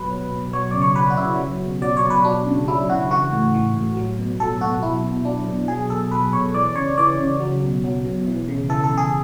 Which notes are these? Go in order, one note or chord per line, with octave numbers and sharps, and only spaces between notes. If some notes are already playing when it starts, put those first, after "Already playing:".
Already playing: B2 F#3 B4
F#3
B2
F#3 C#5
C#3 D5
C#5
F#3 B4
F#4
C#3 E4
F#3
B2
F#3 D5
C#5
B2
B4
F#3 D4
C#3
F#3 E4
C#3 F#4
E3 F#4
A2
E3
A2
F#3
B2
F#3 A4
B2 F#4
F#3 E4
B2
F#3 D4
B2
F#3 G#4
B2 A4
F#3 B4
B2 C#5
E3 D5
C#3 C#5
E3 D5
C#3
F#3
B2
F#3
B2
E3
C#3
E3 A4
A4
C#3
G#4